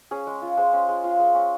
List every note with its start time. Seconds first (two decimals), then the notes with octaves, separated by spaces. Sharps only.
0.11 C#4 G#4
0.27 G#3
0.42 F4
0.57 G#3 C5
0.73 C#4
0.89 G#3
1.04 F4
1.19 G#3
1.35 C#4